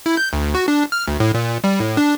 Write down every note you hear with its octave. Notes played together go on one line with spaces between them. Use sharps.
E4
G6
D2
F#4
D4
F6
D2
A2
A#2
G3
A2
D4